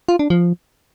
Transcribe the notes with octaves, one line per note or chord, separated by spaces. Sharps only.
F4
D4
F3